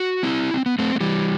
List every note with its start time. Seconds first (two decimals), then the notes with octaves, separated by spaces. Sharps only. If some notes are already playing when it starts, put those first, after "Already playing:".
Already playing: F#4
0.23 C4 E4
0.54 C4
0.66 B3
0.79 A3 C4
0.96 A3
1.00 E3 G3